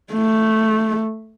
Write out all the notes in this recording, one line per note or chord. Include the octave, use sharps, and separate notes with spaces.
A3